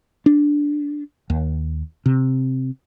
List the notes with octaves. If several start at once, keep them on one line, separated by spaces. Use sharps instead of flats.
D4
D#2
C3